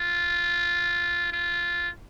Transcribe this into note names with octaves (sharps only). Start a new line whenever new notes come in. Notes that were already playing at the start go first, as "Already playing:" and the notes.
Already playing: F4
F4